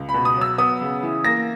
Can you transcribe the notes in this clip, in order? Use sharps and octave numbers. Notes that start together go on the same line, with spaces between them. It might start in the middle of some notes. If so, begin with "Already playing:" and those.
Already playing: C#2
B5
B2
D#6
F#3 E6
B3 D#6
C#3
E3
A#3 A#6